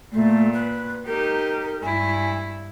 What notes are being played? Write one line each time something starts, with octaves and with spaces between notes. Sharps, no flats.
A#2 A3
B4
D#4 G4 A#4
G2 E4 G#5